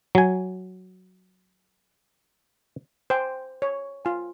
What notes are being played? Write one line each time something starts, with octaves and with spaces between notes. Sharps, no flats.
F#3 G#5
C5 G5 G#5
C#5
F4 G#5